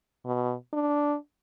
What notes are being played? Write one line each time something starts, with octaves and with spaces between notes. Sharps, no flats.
B2
D4